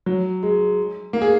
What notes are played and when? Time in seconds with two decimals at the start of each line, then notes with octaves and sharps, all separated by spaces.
0.06 F#3
0.43 G#3
1.13 A#3
1.22 G#4